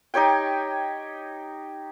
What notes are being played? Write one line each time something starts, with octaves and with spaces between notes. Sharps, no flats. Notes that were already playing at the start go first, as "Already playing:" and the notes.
D#4 G4 C#5 G5